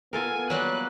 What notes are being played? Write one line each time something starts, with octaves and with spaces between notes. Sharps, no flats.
B3 F4 A4 A#4 G#5
F#3 G3 A#3 F#6